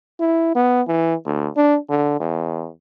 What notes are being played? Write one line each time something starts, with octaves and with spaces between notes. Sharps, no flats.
E4
B3
E3
D2
D4
D3
E2